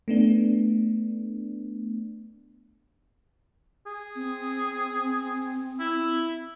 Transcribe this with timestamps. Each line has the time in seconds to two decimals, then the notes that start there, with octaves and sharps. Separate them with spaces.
0.08 A3 B3 D4
3.86 G#4
4.15 C4
5.80 E4